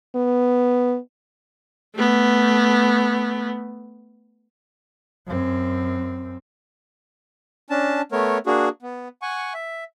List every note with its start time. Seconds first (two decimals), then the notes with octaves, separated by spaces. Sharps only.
0.16 B3
1.95 A3 B3
5.27 F#2 C4
7.70 C#4 D4 A5
8.12 A3 B3 A#4 C#5
8.47 A#3 D4 F#4 G#4
8.82 B3
9.22 F#5 G#5 C#6
9.54 E5